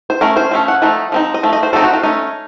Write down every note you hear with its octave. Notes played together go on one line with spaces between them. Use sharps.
C5
A3 C#4 A#4
C5
F3 A3 C#4
F#5
F3 A3 D#4
F3 C4 D#4
D#5
F3 A3
D#5
C5
F3 A3 C4 D#4 A4
F#4
F4
A3 C#4 D#4